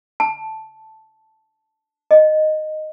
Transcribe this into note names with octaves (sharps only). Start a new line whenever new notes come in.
A5
D#5